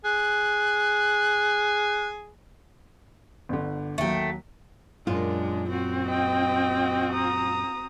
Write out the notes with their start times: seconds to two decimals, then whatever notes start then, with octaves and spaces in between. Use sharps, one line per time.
0.05 G#4 F#6
3.49 G1 D3
3.98 D#2 F#3 A3 G5
5.07 F#2 A#2 G#3 D4 F4
5.70 C4 F#4
6.07 D#5 G5
7.13 A#5 D#6